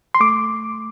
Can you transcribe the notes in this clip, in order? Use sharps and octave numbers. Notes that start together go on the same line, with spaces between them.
C6
A3 D6